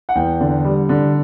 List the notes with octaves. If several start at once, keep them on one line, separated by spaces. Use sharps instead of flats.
F#5
E2 G5
D3
G3
D3